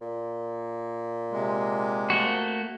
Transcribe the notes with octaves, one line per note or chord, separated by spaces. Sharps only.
A#2
C3 G#3
A3 A#3 F#4